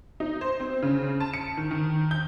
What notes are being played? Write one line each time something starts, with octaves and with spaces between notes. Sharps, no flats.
D#4
C5
C4
C#3
A5
C#7
D#3
D#3
G6